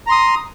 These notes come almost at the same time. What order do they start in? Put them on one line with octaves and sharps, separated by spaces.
A#5 C6 D#6